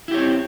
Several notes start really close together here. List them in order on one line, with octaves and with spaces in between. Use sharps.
E4 G4 C#5 C4